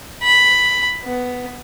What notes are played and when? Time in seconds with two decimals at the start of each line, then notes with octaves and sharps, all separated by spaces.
0.23 B5
1.04 B3